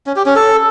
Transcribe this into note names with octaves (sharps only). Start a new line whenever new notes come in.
C#4
G4
C#4
A4